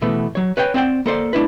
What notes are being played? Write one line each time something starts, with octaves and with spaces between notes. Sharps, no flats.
B2 E3 A3 B3
F#3 C#5
B4 C#5 F5 G5 G#5
C4 C5 D5 F#5 G5
A#3 A4 C5 D5
A3 D4 E4 B4